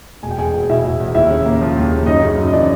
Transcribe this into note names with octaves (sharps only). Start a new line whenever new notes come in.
E1 G#5
G5
E2 G#4 G#5
E1
B2 E4 E5
E1
E2
D#2 E4 E5
C#3
A#3
F3
D#2
C#3
F#2 D#4 D#5
C#3
F#2
D#5
E3 D4 D5